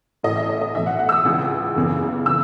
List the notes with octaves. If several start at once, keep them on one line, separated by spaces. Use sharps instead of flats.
A1 A2 E3 D#5
E5
D#5
D#5
B1 A2 E3 E5
F#5
F#5
E6
D#6
C#2 C#3 E3
F#1 E2 C#3 E3
C#3 E3 E6